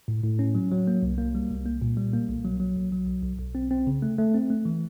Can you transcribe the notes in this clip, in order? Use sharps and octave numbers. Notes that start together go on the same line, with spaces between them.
A2
A2
C#4
F#3
F#3
A#3
C2
A#3
G3
C2
A#3
A#2
G3
A#3
B1
F#3
F#3
B1
F#3
B1
B1
B1
C4
C4
C#3
A3
A3
C4
A3
E3